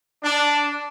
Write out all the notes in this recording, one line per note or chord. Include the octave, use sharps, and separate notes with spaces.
D4